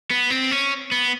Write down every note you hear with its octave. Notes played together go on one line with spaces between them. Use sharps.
B3
C4
C#4
B3